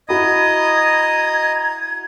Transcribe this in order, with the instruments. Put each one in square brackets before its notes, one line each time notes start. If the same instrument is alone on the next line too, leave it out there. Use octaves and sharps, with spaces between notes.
[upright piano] E4 F#4 B5 [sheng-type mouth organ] D#5 D#6 [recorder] A#5 [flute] G#6